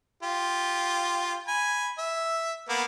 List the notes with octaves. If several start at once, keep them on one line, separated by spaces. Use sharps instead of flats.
F4 G4
G#5 B5
E5
A#3 B3